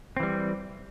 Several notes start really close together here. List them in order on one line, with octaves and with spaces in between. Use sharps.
C4 E3 G3